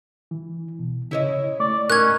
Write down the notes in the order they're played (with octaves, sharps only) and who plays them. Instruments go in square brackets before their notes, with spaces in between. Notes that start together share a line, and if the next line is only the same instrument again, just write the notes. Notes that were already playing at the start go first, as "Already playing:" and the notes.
[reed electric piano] E3
B2
[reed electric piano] C#3 [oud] E4 C#5 D#5
[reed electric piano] A3 C#6 D6 [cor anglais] D5
[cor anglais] C#4 [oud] D#4 A#4 [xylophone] F#6 G#6